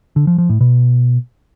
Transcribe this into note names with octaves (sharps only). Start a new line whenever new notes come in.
D3
F3
F3
A2
B2